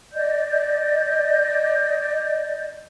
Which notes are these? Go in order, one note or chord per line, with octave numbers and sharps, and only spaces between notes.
D5 D#5 G6